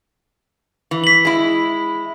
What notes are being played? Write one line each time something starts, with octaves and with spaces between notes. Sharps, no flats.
E3
B6 F#7
G#3 E4